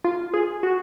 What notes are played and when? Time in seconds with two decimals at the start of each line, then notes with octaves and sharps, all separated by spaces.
0.04 F4
0.34 G#4
0.63 F#4